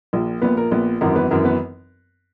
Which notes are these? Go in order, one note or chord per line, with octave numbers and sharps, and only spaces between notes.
A#1 A#2
A#1 A#2 B3 B4
A#4
A#1 A#2 B3 B4
G#1 F#2 E3 A#4
B3 B4
G#1 F#2 E3 A#4
B3 B4